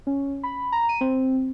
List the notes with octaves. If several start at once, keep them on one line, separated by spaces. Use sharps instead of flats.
C#4
B5
A#5
D#7
C4